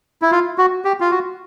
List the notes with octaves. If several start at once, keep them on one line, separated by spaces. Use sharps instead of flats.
E4
F4
F#4
G4
F4
F#4